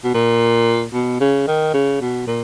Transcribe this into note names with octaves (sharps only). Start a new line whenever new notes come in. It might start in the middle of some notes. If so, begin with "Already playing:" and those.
B2
A#2
B2
C#3
D#3
C#3
B2
A#2